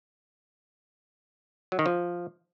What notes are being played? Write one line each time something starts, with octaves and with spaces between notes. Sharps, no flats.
F#3
D#3
F3